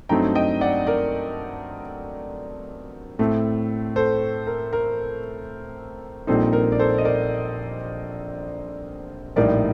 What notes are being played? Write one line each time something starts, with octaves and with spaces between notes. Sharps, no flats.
G2 F#3 A3 C4 D#4 G5 A#5
D#5 G5
D5 F#5
A#4 D5
A2 A3 C4
A4 C5
A#4
A#4
A#1 A#2 G3 C4 D#4 A4 C5
A#4
D5
A4 C5
D#5
A#4 D5
A#1 A2 G3 A#3 D#4 A#4 D5